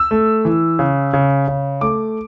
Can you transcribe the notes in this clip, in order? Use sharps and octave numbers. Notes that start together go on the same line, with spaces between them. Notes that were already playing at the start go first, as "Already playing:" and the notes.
Already playing: E6
A3
E3
C#3
C#3
C#3
A3 D6